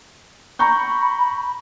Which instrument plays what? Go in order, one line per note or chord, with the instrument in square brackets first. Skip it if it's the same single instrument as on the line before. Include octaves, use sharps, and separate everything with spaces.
[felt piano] A#5 C#6 G6 [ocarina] B5